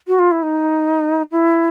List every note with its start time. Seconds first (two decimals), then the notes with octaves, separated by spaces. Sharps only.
0.08 F#4
0.19 F4
0.31 E4
0.43 D#4
1.31 E4